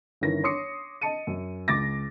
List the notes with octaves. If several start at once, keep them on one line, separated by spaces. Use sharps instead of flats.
G1 D#3 E3 C#4 A#4 A#6
C#5 C6 D6 D#6 C7 C#7
D#5 A5 C#7 D#7
F#2
C#2 D6 A6 A#6